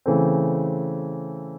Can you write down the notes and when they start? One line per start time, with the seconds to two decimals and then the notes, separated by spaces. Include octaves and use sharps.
0.06 C#3 E3 A3 C4